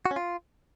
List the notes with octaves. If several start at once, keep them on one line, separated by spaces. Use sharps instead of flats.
F#4
C#4
F4